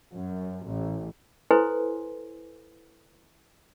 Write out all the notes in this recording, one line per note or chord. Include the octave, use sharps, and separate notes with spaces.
F#2
A1
E4 A4 B4 C5 G#5 C6